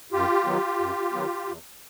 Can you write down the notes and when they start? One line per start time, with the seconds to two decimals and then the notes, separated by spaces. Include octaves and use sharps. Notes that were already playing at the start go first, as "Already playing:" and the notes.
0.12 F#2 F4 G4
0.46 D#3 F#3 B3
0.80 F#2
1.12 D#3 F#3 B3
1.46 E2